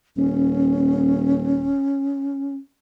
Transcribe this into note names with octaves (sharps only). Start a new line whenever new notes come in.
D#1 C#4